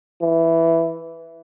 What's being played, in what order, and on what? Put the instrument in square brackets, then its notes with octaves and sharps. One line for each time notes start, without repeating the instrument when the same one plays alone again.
[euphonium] E3